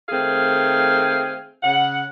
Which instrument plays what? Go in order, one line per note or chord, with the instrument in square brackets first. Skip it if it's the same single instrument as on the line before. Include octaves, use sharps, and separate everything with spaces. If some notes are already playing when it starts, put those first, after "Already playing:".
[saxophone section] D#3 A3 C4 G#4 F5
C#3 F#5